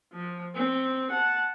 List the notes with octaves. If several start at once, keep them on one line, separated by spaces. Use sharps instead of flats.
F3
C4
F#5 A5